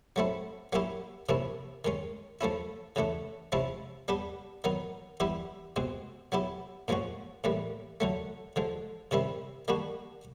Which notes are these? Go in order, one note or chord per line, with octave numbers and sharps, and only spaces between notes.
F#3 A3 C4 E4
F#3 A#3 C#4 E4 G4
C3 F3 A#3 C#4 E4
D#3 G#3 C#4
F3 A3 C#4 E4
C#3 E3 A3 D4
C3 F3 G#3 C#4 E4
G3 B3 D4 G4
D#3 F#3 B3 D#4
E3 G3 B3 E4 G4
B2 G#3 C4
F#3 B3 E4 G4
A#2 F3 G#3 C#4 F#4
A2 E3 G3 A#3
D3 F#3 A3
D3 F3 G#3
C3 D#3 G3 C4 E4
D#3 G3 A#3 D4 F#4